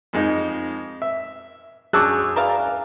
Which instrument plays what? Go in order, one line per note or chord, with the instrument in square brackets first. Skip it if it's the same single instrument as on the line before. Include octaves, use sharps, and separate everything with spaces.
[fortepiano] F2 G#3 D#4
E5
[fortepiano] F#2 [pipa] D4 C#5 [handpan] G#4 [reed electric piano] D6 E6 F#6
[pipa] E3 D5 F5 [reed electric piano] A#5